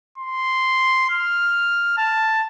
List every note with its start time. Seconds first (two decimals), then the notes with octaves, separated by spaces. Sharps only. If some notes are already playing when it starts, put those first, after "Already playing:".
0.18 C6
1.10 F6
1.98 A5